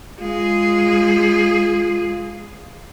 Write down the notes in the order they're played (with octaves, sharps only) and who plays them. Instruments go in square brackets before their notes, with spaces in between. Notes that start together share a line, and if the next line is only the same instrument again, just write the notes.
[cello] G#3 G#4 [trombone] F4